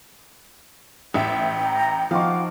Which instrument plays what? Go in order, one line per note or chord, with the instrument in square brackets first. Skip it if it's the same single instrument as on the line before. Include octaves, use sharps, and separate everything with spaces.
[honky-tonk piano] A1 E5 [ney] G5
[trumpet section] A#5
[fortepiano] F3 D#4 C#6 [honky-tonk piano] F5 [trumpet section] F#5 D6